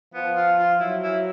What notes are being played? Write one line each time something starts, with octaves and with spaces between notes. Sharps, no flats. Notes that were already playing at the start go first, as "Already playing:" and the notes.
F3 B3
F4
F4
F#3 E4
E4